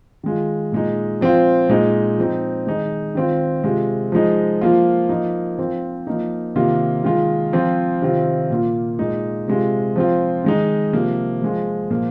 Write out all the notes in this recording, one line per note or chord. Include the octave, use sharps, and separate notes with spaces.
D#3 G#3 F4
A#2 G#3 D#4
F3 C4 F4
A#2 G#3 D#4
F3 C4 D#4
D#3 G#3 D#4
D#3 C4 F4
C3 G#3 F4
F3 G#3 D#4
F3 A#3 F4
F3 A#3 D#4
F3 C4 F4
F3 A#3 D#4
C3 D#3 A#3 F4
D#3 G#3 F4
F3 C4 F4
C3 D#3 C4 F4
A#2 A#3 F4
A#2 G#3 D#4
C3 G#3 F4
F3 C4 F4
D#3 G#3 D#4
C3 F3 A#3
F3 G#3 F4
A#2 F3 A#3